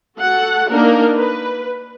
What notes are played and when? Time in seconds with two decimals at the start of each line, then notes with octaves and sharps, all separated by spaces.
0.18 F#4 A4 F#5
0.70 A#3 D4 D#4 A#4
1.16 B4